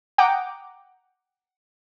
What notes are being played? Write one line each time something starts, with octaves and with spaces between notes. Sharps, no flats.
F#5 G5 A#5 D6 D#6